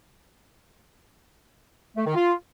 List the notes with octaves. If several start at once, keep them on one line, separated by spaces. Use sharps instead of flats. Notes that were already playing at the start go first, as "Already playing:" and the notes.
A3
D#3
F4